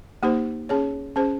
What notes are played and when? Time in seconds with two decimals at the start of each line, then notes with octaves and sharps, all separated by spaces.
0.23 A#3 D#4 G4 C5
0.69 C#4 G#4 C#5
1.16 C#4 G#4 C5